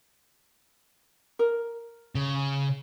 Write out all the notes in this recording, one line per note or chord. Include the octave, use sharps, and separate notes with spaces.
A#4
C#3